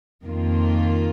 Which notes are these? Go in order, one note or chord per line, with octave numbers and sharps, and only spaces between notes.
F2 D#3 A#3 F4